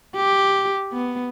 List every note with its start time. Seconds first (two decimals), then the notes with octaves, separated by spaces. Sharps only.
0.16 G4
0.93 B3